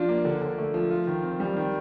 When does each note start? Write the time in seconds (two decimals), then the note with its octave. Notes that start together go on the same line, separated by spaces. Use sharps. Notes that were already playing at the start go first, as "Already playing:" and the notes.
Already playing: F3 D4 F4
0.09 A#3
0.25 D3
0.41 D3
0.58 A3
0.74 F3
0.91 F4
1.07 D#3
1.23 C4
1.40 G3
1.57 D#3